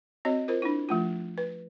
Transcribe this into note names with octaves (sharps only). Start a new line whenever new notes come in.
C4 F#4 C#5 D#5
F4 A#4 C5
D4 E4
F3 A3 F4
B4